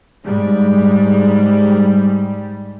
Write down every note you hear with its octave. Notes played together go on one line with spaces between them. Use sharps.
G#2 G3